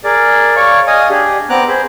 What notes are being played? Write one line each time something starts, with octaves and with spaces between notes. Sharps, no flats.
G#4 A#4 D5
C#5 D5 F5 C#6
D#5 F5 G#5 D#6
D4 G4 G#4
B3 C4 A#5 D6 F#6
G#4 B4 C5